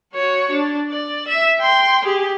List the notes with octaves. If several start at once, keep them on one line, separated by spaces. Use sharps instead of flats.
F#4 C#5
D4
D5
E5
G5 C6
G4 G#4